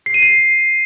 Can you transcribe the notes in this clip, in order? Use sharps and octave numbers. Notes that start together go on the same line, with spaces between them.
C7
D#7
C7